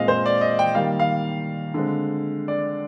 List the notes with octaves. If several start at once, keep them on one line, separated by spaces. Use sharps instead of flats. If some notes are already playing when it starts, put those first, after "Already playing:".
Already playing: A#2 G#3 C4 D#5 F5
C5
D5
D#5
G5
D#3 G3 A#3 F5
F5
D3 G#3 C4
D5